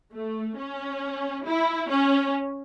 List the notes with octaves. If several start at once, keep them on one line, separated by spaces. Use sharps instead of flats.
A3
C#4
E4
C#4